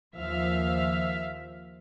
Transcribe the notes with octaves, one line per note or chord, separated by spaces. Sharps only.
D#2 F3 E5 F5